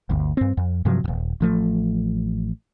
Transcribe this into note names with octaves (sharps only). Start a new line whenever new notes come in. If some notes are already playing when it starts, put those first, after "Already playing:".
G1 D2
G2 C4
F2
G2 C3 F3 F#3
D#1 F#2
A1 F3 A3